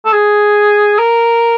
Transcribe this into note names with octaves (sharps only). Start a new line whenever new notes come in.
A4
G#4
A#4